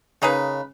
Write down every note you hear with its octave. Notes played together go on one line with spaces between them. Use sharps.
C#3 A#3 D#4 G#4 B4